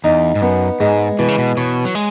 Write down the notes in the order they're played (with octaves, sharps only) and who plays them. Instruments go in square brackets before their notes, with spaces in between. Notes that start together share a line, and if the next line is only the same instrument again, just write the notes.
[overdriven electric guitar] E2 [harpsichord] D#4
[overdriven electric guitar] G#2
[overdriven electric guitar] F#2 [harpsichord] B3
[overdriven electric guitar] G#2 [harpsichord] G#3
[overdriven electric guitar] B2 [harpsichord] E3
[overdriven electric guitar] C#3
B2
[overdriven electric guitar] B2 [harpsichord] C#5
[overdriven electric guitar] F#3
G#3